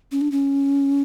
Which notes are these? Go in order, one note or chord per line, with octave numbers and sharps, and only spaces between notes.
C#4
D4
C#4